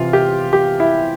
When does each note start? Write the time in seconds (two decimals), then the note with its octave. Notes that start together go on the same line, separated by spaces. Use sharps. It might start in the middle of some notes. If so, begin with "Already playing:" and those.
Already playing: C3 E3 F4
0.13 G4
0.53 G4
0.80 E4